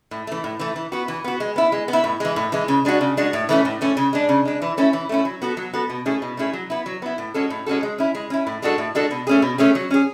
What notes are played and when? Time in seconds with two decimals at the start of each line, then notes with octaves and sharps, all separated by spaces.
0.11 A2
0.27 E3 A3
0.44 A2
0.59 E3 A3
0.76 E3
0.92 B3 F#4
1.08 E3
1.24 B3 F#4
1.40 G#3
1.56 B3 E4
1.72 G#3
1.88 B3
1.93 E4
2.04 A2
2.20 E3 G#3
2.36 A2
2.52 E3 G#3
2.68 C#3
2.85 G#3 D4 F#4
3.01 C#3
3.17 G#3 D4 F#4
3.33 A2
3.49 E3 A3 C#4
3.65 A2
3.81 E3 A3 C#4
3.97 C#3
4.13 G#3 D4
4.29 C#3
4.45 G#3 D4
4.62 E3
4.77 A3 C#4 E4
4.93 E3
5.09 A3 C#4 E4
5.25 F#3
5.42 B3 F#4 A4
5.57 F#3
5.74 B3 F#4 A4
5.90 B2
6.06 A3 C#4 E4 G#4
6.22 B2
6.37 A3 C#4 E4 G#4
6.53 F#3
6.70 B3 E4
6.86 F#3
7.02 B3 E4
7.18 A2
7.34 G#3 C#4 F#4 A4
7.50 A2
7.66 G#3 C#4 F#4 A4
7.83 G#3
7.98 C#4 E4
8.15 G#3
8.30 C#4 E4
8.47 A2
8.62 G#3 D4 F#4 A4
8.78 A2
8.95 G#3 D4 F#4 A4
9.11 B2
9.27 A3 C#4 G#4
9.42 B2
9.58 A3 C#4 G#4
9.75 F#3
9.91 C#4 G#4